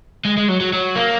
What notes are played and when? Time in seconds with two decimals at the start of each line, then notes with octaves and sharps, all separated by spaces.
0.25 G#3
0.37 G#3
0.49 F#3
0.61 F#3
0.73 F#3
0.96 A#3